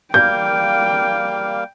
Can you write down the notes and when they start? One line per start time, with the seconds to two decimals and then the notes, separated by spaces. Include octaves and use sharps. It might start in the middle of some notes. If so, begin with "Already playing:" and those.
0.14 G3 A#3 F5 G5 G6